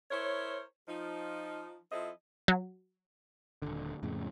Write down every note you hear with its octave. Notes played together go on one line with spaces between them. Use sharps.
E4 A#4 C5 C#5
F3 D#4
F3 C4 E4 A4 D#5
F#3
D#1 A#1 D3
F2 A2 C#3